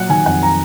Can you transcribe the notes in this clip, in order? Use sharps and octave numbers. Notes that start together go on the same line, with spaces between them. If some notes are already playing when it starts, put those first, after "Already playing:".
Already playing: A#2 F#3 F#5
D#3 G#5
F2 F#5
A#5